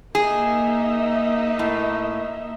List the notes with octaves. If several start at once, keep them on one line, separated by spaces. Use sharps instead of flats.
A#3 D#4 G#4 E5
A2